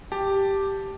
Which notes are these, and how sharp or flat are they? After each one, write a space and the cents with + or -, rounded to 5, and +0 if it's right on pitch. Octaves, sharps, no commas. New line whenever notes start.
G4 +0 A5 +0